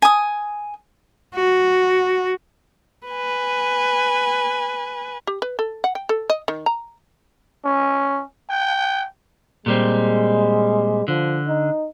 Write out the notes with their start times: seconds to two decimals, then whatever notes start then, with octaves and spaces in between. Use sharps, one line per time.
0.02 G#5 D#6
1.35 F#4
3.08 B4 G#5
5.27 G4
5.42 B4
5.59 A4
5.84 F#5
5.95 G5
6.09 A4
6.30 D#5
6.48 D#3
6.66 A#5
7.65 C#4
8.50 G5
9.66 A#2 G3 G#3 C4
11.08 D3 F3
11.47 D#4